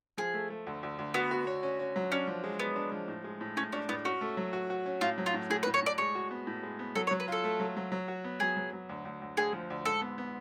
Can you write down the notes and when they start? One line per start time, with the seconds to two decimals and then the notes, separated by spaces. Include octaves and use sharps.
0.18 F3 G#4
0.34 A3
0.50 A3
0.67 D2
0.83 D2
0.99 D2
1.14 B3 F#4
1.31 F#4
1.47 C#5
1.63 C#4
1.79 C#4
1.96 F#3
2.11 C#4 D4
2.28 F3
2.44 G#3
2.59 G#3 B3
2.76 D4
2.92 F3
3.08 A2
3.24 G#3
3.41 A2
3.57 A2 C#4
3.72 C#4 D4
3.89 A2 B3
4.05 C#4 F#4
4.21 A3
4.37 F#3
4.53 F#4
4.70 F#4
4.86 C#4
5.01 A2 F4
5.18 F#3
5.26 F4
5.34 A2
5.50 A2 G#4
5.63 B4
5.67 A2
5.74 C#5
5.83 A2 D5
5.98 G#3 C#5
6.15 F#4
6.31 B3
6.47 A2
6.63 G#3
6.79 B3
6.95 F#3 A4
7.07 C#5
7.11 F#3
7.20 B4
7.28 F4 A4
7.44 A3
7.60 F#3
7.77 F#3
7.92 F#3
8.08 F#4
8.24 B3
8.40 F#3 G#4
8.57 F#3
8.73 F#3
8.89 D2
9.05 D2
9.21 D2
9.37 D2 G#4
9.53 F3
9.70 D2
9.85 G#2 A4
10.02 B3
10.18 B3